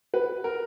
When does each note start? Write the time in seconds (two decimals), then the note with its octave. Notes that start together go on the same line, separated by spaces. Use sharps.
0.14 B4
0.44 A#4